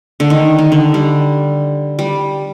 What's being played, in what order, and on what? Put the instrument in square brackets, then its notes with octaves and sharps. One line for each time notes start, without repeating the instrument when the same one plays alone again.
[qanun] D3
D#3
D#3
D3
G3
G3